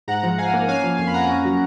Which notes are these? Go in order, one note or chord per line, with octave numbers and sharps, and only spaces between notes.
G#2 F#5 A#5
F3
G#2 F5 G#5
A#3
C#4 F5 G#5
F3
F2 F5 G#5
B5
A#3 F#5 A#5
C#4
F#3